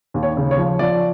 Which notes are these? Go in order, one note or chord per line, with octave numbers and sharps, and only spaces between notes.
D#2
C#5
C#3
C#5
F3
F3 D5